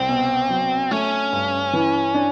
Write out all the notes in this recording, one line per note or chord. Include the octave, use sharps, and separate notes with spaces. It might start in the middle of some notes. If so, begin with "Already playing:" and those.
Already playing: C2 C4
B2
F#3
A3 C#4
G2
E3
D4